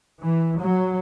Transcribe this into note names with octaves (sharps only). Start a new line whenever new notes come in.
E3
F#3